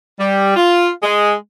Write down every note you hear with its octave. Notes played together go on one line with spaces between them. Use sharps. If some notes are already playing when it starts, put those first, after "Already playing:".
G3
F4
G#3